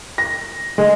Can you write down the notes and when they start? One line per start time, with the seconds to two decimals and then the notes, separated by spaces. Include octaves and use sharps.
0.18 A#6
0.78 G#3